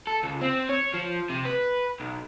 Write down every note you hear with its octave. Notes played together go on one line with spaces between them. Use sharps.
A4
C#2
C4
C#5
F3
C3
B4
B1